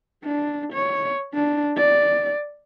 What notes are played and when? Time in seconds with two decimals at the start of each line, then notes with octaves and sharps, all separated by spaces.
0.24 D4
0.73 C#5
1.34 D4
1.77 D5